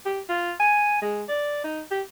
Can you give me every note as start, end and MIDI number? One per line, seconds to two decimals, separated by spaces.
0.05 0.21 67
0.29 0.54 65
0.60 1.00 80
1.02 1.23 56
1.28 1.63 74
1.64 1.81 63
1.91 2.02 67